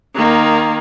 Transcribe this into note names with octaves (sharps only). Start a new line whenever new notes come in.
D#3 A#3